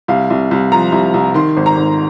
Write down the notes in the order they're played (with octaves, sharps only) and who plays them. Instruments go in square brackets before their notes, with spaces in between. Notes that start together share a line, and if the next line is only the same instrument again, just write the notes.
[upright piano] C2 F5
C2
C2
F3 A#5
C2
C2
D#3 C6
G#1
A#5
G#1